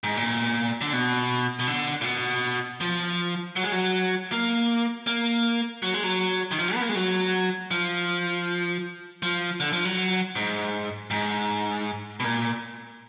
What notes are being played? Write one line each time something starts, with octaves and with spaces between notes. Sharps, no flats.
G#2
A#2
D3
B2
B2
D3
A#2
B2
F3
F#3
G#3
F#3
A#3
A#3
F#3
G#3
F#3
D#3
F3
B3
A#3
G#3
F#3
F3
F3
D3
F3
F#3
G#2
G#2
B2
A#2